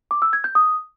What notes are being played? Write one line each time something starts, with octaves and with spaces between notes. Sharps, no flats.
D6
E6
G#6
G6
D#6